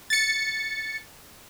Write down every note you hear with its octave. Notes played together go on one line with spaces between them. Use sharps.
A6 C#7